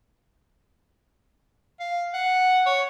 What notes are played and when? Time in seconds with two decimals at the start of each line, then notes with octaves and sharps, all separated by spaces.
1.80 F5
2.14 F#5
2.66 C#5